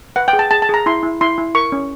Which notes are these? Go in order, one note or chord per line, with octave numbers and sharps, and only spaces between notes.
B4 F#5
G5
G#4
A5
G#4 A5
A5
G#4 A#5
E4 C6
E4
E4 C6
E4
A#4 C#6
C#4